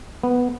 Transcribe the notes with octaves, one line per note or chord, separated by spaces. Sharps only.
B3